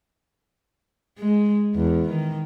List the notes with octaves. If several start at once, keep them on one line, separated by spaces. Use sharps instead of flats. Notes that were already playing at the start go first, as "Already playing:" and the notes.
G#3
E2
D#3